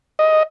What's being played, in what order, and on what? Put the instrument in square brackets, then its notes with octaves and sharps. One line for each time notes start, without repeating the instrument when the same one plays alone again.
[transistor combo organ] D#5